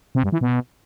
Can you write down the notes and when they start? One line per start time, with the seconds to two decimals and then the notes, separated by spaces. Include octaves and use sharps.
0.15 C3
0.24 G2
0.32 E3
0.41 B2